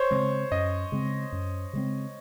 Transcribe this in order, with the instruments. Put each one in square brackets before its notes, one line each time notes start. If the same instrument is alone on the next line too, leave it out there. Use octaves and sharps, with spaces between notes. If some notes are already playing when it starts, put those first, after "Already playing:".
Already playing: [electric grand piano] C5 C#5
[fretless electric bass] C#3 G#3 C4
[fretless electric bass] F#2 [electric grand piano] D#5
[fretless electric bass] C#3 G#3 C4
F#2
C#3 G#3 C4